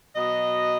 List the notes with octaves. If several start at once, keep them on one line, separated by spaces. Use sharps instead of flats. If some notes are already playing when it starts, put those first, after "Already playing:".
B2 F#3 D#5